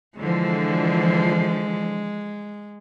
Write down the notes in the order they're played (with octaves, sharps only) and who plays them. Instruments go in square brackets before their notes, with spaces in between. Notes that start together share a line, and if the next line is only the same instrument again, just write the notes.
[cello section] D3 E3 F3 [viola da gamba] G#3